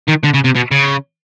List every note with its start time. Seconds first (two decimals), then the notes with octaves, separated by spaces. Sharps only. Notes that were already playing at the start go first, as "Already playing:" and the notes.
0.08 D#3
0.24 D3
0.35 C#3
0.45 C3
0.56 B2
0.72 C#3